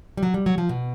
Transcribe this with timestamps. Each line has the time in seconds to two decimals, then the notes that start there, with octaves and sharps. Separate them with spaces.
0.17 G3
0.23 F#3
0.34 G3
0.46 F#3
0.58 F3
0.69 B2